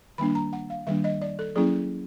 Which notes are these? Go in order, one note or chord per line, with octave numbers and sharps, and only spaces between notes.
D#3 G3 A#3 D4 B5
A#5
F#5
F5
D#3 G3 A#3 D4 E5
D#5
D5
A4
F#3 A#3 C#4 E4 G#4